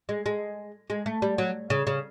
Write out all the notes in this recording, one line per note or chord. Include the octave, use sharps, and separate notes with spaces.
G#3
G#3
G#3
A3
G3
F#3
C#3
C#3